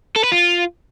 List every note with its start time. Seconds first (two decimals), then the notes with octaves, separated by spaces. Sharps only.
0.16 A4
0.24 B4
0.32 F4